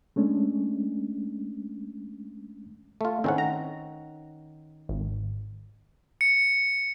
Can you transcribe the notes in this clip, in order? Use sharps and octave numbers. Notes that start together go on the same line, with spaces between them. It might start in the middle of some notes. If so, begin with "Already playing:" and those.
G#3 A3 C#4 D4
A3 F4
A2 D#3 C4 C#4 F#5
A#5
G#1
C#7